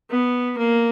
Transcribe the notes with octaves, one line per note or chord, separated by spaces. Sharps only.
B3
A#3